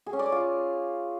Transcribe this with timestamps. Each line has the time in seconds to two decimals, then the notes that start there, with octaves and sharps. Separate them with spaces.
0.06 G#4
0.13 C#4
0.19 D5
0.26 C#5
0.32 F4